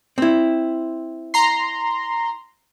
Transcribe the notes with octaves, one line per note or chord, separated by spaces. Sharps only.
C4 E4
A#5 C6